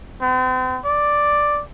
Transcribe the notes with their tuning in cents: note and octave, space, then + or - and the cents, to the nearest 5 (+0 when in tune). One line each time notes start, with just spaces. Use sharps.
C4 -40
D5 +5